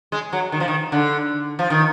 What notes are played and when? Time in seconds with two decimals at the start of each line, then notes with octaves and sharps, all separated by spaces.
0.12 G#3
0.33 F#3
0.52 D#3
0.60 F3
0.68 D#3
0.92 D3
1.59 F3
1.70 D#3